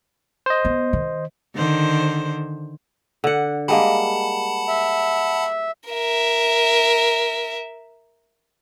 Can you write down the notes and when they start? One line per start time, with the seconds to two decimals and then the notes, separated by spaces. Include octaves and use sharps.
0.46 C5 D#5
0.65 B3
0.93 D#3
1.55 D3 D#3 C5
3.24 D3 F#5
3.68 G3 G#3 A#3 F#5 A5 B5
4.68 E5
5.89 A#4 E5